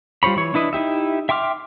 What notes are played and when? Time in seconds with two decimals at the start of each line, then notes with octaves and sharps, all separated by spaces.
0.23 G3 F4 C5 C#5 B5
0.37 E3 C#5
0.54 D4 E4 B4 D#5
0.73 D#4 E4 G4 E5
1.29 E5 G5 C6 D6 F6